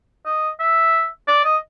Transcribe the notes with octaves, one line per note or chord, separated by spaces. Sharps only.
D#5
E5
D5
D#5